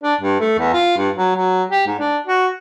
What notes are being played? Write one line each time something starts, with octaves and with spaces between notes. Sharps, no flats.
D4
G2
A3
E2
F4
G2
F#3
F#3
G4
G#2
D4
F#4